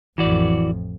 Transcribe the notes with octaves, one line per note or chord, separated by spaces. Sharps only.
A1 F2 E3 F#4 D5